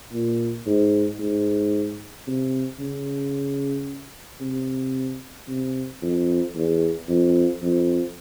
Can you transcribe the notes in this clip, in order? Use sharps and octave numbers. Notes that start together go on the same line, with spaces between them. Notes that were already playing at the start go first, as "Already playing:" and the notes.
A#2
G#2
G#2
C3
C#3
C3
C3
F2
E2
F2
F2